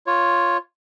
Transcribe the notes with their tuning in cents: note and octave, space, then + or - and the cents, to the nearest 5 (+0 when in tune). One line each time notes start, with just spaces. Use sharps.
F4 +0 C#5 +0